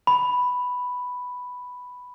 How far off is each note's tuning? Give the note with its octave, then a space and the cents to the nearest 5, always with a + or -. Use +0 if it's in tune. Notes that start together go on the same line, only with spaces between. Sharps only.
B5 +0